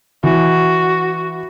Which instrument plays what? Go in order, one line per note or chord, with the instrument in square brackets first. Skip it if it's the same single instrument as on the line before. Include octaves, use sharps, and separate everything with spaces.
[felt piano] E3 [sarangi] F#4